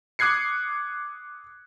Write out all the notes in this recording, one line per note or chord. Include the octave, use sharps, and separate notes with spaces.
D6 D#6 F#6 G#6 C7 C#7